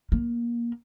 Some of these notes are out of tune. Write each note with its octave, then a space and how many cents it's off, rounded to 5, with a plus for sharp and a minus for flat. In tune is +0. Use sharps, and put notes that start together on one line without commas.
A#3 +20